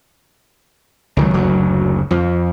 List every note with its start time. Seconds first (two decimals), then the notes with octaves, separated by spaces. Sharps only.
1.17 C#2 D#3 F#3
1.34 F#1 D2 F#3
2.11 F2 F3